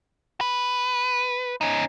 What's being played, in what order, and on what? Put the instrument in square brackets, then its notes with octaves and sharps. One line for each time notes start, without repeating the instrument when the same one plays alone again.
[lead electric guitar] B4
C#4 D#4